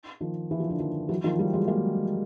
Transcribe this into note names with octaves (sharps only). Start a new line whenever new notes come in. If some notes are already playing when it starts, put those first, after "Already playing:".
D#3 F3
E3
F3
D3 E3
D#3 F3
E3 F#3
D#3 F3
F3 G3
F#3 G#3
G#3 A#3